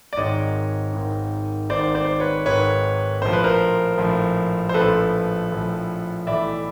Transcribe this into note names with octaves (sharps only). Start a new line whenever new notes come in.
D5
G#1 G#2 D#3 C#5 D#5
G#1 G#2 D#3
G#1 G#2 D#3 C5 D5
C5 D5
B4 C#5
G#1 G#2 D#3 B4 C#5
A#1 A2 F3 C5
B4
A#4 C5
A#1 A2 F3
C5
A#1 A2 F3 A4 B4
A#1 A2 F3
B1 A2 E3 D5 E5